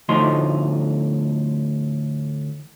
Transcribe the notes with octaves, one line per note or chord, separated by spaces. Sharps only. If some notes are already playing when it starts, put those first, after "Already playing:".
D2 A2 F3 D#4 C6